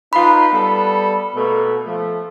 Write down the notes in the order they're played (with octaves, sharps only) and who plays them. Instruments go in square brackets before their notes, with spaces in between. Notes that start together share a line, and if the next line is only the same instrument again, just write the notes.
[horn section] D#4 F4 B4 [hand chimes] B5
[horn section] G3 B3 A4
B2 A3 A#3
F3 A3